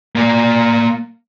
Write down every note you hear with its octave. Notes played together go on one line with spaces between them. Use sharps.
A#3 D5